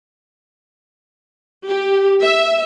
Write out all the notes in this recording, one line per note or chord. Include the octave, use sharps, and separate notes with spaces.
G4
E5